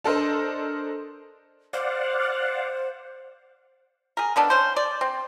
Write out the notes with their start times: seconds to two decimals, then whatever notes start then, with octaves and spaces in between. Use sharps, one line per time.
0.04 D4 A4 A#4 C5 D#5
1.73 C5 D5 F5 F#5
4.17 G#4 A#4
4.36 D#3 B3 D4 A4
4.50 C#4 C5
4.76 D5
5.01 C4